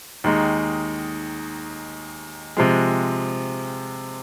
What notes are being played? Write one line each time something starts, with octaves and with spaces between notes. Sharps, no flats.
D#2 D#3 G#3 D#4
C3 F3 G#3